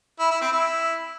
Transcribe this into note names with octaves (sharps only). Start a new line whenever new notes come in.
E4
E4
C4
E4